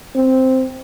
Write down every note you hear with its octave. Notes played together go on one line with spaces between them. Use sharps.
C4